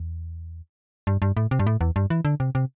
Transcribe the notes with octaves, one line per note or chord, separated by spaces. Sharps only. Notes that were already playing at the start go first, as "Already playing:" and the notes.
Already playing: E2
G2
G2
A2
C3
G2
A2
E2
G2
E3
D3
C3
C3